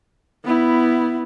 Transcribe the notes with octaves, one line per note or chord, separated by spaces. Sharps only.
B3 E4